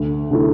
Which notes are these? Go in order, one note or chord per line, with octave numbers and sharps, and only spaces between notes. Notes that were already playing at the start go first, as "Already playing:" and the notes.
Already playing: D2
D3 A3 E4